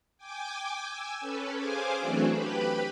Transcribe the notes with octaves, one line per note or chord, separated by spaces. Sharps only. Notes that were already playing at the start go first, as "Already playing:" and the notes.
G5 G#5 D6
G#5 E6
C#4 A4 B4
G#4 C5 F5 G#5 D6
E3 F#3 A3 C4 D4 F#4
G4 B4 B5